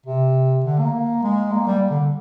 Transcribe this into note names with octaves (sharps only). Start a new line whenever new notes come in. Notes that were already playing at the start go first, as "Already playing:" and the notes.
C3
D3
A#3
G#3
A#3
G3
D3